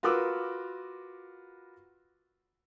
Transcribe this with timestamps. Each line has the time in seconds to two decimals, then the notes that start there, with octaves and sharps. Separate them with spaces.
0.03 F4 F#4 A#4 B4 D6 E6